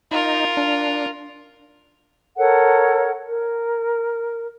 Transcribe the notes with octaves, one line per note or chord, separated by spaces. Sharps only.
D#4 F4 A#4
D4
A4 A#4 C#5 F#5
A#4